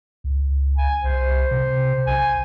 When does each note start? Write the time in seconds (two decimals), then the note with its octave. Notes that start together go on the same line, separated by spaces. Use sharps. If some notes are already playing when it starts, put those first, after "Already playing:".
0.24 C#2
0.77 G#5
1.04 C2 C5
1.51 C3
2.07 B1 G#5